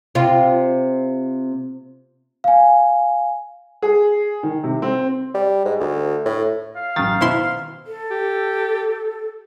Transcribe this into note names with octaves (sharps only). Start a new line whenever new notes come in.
C3 F4
F5 G#5
G#4
D#3
C3
C4
G3
G#2
D2
A2
F5
A1 F#2 D#3 A6
B2 E4 C5 C6
A4
G4